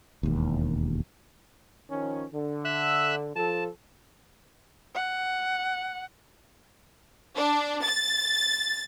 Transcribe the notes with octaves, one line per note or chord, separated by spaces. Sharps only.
E1 D#2
D#3 F3 C#4
D3
E5 E6 F#6
F3 A4 A5
F#5
D4
A6